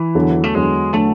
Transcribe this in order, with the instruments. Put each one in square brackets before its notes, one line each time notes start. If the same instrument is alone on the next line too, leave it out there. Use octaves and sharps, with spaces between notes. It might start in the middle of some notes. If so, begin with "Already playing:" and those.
Already playing: [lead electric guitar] E3
[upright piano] E2 D3 F#3
[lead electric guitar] A3
[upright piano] E2 D3 F#3 [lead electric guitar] G#3
[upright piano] D3 F#3 [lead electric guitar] A3